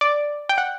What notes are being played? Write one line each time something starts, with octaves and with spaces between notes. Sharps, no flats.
D5
G5
F#5